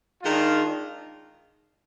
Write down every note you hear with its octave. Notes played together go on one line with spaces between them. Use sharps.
D#3 G#3 D4 F4